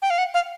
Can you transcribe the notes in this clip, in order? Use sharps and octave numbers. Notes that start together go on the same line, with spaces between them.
G5
F5
F#5
F5